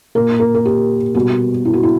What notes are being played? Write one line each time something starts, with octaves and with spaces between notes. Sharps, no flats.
A#2 A#3 A#4
A#4
A#4
G4
B2 G3 B3 F#4
E4
F#4
E4